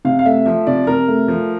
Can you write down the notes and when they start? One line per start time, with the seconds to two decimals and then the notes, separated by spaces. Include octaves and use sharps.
0.05 C3 F5
0.19 F5
0.25 A3 E5
0.46 F3 E5
0.67 C3 D5
0.87 C3 A#4
1.08 A3
1.28 F3